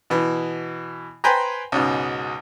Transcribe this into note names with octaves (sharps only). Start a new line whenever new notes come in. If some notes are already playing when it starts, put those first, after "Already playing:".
B2 E3
B4 C5 G5 G#5 A#5
C#2 G#2 B2